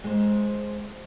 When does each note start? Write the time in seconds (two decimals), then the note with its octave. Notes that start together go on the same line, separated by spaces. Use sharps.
0.04 G#3 C5